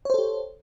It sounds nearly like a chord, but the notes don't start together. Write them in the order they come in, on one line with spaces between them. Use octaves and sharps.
C#5 C5 A4 G4